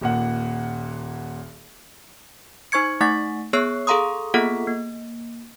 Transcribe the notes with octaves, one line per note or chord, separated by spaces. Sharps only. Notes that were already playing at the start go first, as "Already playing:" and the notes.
D#1 A#2 F#5
D#4 C5 C#6 G#6 C#7
A3 D#4 F#5 C#6 A6
B3 G#4 C#5 E6 F#6 C7
G#4 A4 F5 A#5 C6 D#6
A#3 B3 F4 G#4 A4 F#5
A#3